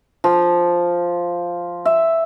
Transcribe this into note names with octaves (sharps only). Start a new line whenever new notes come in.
F3
E5